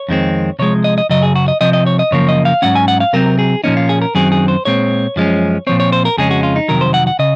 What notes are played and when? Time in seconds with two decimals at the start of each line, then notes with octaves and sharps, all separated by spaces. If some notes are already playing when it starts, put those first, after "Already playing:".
Already playing: C#5
0.09 F2 D#3 G#3 C4
0.59 C3 F3 G#3 C#5
0.84 D#5
0.98 D#5
1.10 F#2 C#3 F#3 D#5
1.23 G#4
1.36 F#4
1.48 D#5
1.61 C3 F3 C4 D#5
1.73 D#5
1.87 C#5
1.99 D#5
2.11 F#2 C#3 F3 A#3 C#5
2.29 D#5
2.45 F5
2.62 G#2 F#3 C#4 F#5
2.75 G#5
2.88 F#5
3.00 F5
3.13 C3 F#3 C4 A#4
3.39 G#4
3.64 A#2 F3 A#3 C#4 D#4
3.77 F4
3.89 G#4
4.02 A#4
4.15 F#2 D#3 F#3 C4 G#4
4.32 G#4
4.48 C5
4.65 A#2 G#3 C4 C#5
5.16 F#2 F3 G#3 C#4
5.67 A#2 F3 C4 C#5
5.80 C#5
5.92 C5
6.05 A#4
6.18 F2 C#3 G#3 C#4 G#4
6.31 F#4
6.43 F4
6.56 D#4
6.68 F2 C3 D#3 F#3 A#4
6.81 C5
6.94 F#5
7.07 F#5
7.19 C#3 D#5